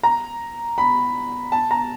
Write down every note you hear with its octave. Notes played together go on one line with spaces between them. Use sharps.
A#5
B5
A5
A#5